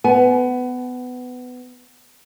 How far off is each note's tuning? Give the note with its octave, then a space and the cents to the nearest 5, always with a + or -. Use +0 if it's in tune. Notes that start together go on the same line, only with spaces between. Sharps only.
B3 +20 G#5 +25